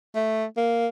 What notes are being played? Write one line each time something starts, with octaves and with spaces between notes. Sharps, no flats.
A3
A#3